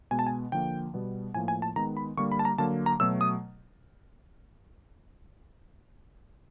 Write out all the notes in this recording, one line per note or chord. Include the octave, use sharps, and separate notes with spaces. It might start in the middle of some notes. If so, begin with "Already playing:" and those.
B2 G#3 B3 G#5
A5
G#5
D3 F3 A#3 G5
B2 G3 B3
A2 F3 A#3 G#5
G#5
A5
D#3 G#3 B3 A#5
B5
D3 G3 A#3 C#6
B5
A5
A#5
D3 F#3 A#3 A5
A#5
B2 F#3 A3 E6
D#6